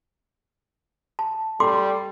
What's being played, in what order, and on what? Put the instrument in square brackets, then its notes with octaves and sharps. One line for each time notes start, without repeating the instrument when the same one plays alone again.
[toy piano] A5
[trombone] G3 [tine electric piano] A4 [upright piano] C6 [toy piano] D6